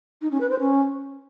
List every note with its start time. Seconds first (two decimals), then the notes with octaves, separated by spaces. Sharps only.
0.22 D#4
0.31 C#4
0.41 B4
0.50 C5
0.60 C#4